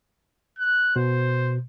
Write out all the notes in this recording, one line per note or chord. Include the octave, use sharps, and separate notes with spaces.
F#6
B2 C5